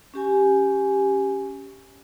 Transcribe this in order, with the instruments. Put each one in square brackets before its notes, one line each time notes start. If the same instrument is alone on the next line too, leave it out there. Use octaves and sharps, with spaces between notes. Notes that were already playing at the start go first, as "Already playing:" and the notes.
[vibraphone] C#4 G4 G#5